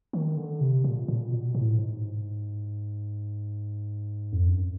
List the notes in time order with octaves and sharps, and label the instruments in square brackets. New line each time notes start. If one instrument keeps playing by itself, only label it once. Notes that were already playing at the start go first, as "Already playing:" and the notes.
[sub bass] D#3
D3
C3
A#2
A#2
B2
A2
G#2
F2
F#2